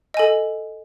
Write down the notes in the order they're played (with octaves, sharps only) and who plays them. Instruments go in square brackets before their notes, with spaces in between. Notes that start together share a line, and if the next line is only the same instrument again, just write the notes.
[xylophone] D#5
G#5
A4